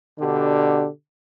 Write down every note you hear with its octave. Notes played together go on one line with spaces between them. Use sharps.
B2 D3 D4 G4